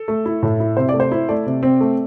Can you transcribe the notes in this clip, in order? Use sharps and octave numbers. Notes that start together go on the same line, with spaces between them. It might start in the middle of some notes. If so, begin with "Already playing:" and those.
Already playing: A4
A3
E4
A2
E4
C3 C5
A3 D5
C5
E4
A3 D5
C3
C4
A3